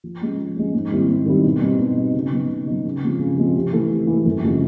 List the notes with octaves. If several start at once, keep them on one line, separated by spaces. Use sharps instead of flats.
F3
G#3 C#4
F3
G#3 C#4
G#2
D#3 G3 C4 E4
G#2
D#3 G3 C4 E4
B2
G3 C4 D#4
B2
G3 C4 D#4
C#3
F#3 B3 D#4
C#3
F#3 B3 D#4
C#3
F3 G#3 C4
C#3
F3 G#3 C4
C3
E3 A3
C3
E3 A3
F#2
C#3 F3 G#3 C4